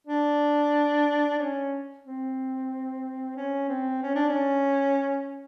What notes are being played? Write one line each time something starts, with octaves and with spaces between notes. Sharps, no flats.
D4
C#4
C4
C#4
C4
C#4
D4
C#4